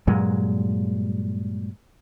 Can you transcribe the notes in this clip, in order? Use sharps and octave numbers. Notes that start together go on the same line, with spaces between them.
G2 A#2 F#3 G#3